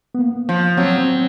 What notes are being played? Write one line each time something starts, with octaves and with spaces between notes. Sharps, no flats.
B3
A#3
F3
F#3 C4
C4